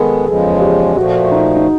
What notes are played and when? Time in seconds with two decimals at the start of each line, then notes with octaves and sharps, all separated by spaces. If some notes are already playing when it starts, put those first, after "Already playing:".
Already playing: D#3 G#3 B3 G#4 A4 B4
0.26 E2 C#3 F3 G#3 G#4
0.60 G4
0.96 A#2 F3 A3 F#4
1.31 D#4
1.56 D#4